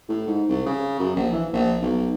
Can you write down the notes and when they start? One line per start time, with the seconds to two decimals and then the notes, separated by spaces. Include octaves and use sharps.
0.09 A2
0.27 G#2
0.49 C2
0.66 C#3
0.99 F#2
1.16 A#1
1.32 E3
1.53 A#1
1.82 B1